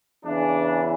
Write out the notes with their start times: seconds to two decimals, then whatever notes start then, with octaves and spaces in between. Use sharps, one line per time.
0.25 E2 C#3 E3 D4